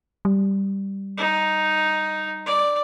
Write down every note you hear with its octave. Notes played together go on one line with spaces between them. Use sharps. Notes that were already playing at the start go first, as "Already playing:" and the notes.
G3
D#4
D5